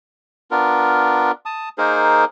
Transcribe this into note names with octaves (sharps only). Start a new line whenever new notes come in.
B3 D4 F4 A#4
A5 D#6
A#3 D#4 G#4 A#4 C5